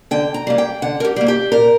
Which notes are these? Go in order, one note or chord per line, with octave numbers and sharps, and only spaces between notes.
D3 G5
A#5
G3 A#3
G5
D3 F#5
A#4
G4
G3 A#3
G4
A#2 A#4